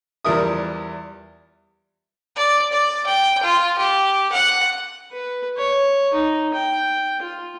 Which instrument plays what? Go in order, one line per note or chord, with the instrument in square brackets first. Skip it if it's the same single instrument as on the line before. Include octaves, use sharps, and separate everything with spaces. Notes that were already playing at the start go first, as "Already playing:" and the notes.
[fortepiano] E2 F3 G3 A#4 E5 D#6
[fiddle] D5
D5
G5
F4
G4
F#5
[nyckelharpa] B4
C#5
D#4
G5
F4